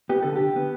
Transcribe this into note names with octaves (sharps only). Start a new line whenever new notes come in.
B3 G4
D3 A4
D3 G4
B3